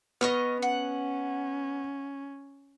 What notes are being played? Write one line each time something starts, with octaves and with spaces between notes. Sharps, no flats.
B3 D#5 C#6 F6
C#4 F#5